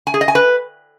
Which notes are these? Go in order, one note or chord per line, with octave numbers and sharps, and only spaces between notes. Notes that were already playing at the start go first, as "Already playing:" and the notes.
G#5
G#4
D#5
G#5
B4